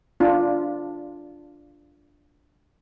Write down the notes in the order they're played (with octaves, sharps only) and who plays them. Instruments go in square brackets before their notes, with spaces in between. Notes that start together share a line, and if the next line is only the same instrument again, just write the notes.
[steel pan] D4 F4